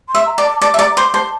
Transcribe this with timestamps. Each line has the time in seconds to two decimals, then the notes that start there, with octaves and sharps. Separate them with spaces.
0.09 C6
0.15 E5
0.26 A#5
0.38 D5
0.44 A5
0.61 D5 A5
0.74 E5
0.79 D5 A#5
0.96 C5 C6
1.14 C5 A5